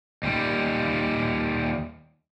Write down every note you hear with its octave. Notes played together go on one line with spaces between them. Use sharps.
D#2 G3